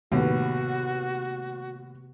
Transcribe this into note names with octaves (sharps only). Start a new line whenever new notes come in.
D#2 A2 C3 B3 F#4